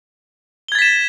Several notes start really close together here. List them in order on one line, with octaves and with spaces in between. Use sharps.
G7 G#6 A6 B6 E7